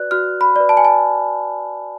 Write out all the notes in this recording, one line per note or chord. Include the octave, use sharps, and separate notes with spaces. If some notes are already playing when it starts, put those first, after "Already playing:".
Already playing: F#4 B4 D5 F#6
F#4 F6
B5
B4 D5
A5
G#5
A5